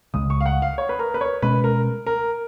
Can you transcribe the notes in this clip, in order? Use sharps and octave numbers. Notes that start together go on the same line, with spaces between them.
C#2 C#3 G#3 D#6
C#6
F5
F#5
F5
C#5
B4
A#4
B4
C#5
B2 G#3 C#4 B4
A#4
A#4